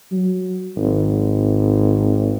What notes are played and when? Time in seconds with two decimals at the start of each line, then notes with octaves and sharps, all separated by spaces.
0.11 F#3
0.77 G#1